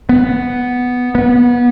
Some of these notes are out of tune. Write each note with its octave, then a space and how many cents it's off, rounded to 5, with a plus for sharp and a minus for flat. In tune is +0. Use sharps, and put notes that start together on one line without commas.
B3 +0
B3 -25